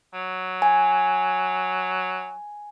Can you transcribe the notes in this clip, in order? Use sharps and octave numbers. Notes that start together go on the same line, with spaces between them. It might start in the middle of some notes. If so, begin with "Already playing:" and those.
F#3
G#5